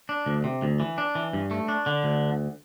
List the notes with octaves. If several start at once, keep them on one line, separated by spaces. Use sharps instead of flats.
D4
D2
C3
D2
E3
D4
E3
G2
A3
D4
D3
D2